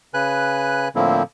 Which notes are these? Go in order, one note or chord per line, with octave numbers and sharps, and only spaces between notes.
C#3 B4 G#5 F#6
A2 D3 F3 A#3 C4 E4